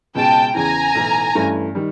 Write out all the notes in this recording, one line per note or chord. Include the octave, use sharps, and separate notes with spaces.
C#2 B2 G#3 G5 A5
E2 C#3 E3 G#5 A#5
B1 A2 E3
G2 E3 A3 C#4
D#3 G3